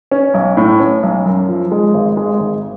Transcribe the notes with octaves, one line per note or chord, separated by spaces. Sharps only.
C#4
B1
A2
C#4
B1
F#2
F3
G#3
G#1
G#3
G#1